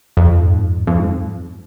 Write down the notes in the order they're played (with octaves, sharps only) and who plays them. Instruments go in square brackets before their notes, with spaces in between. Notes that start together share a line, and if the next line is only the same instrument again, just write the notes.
[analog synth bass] F2
G#2
F2
F2
G#2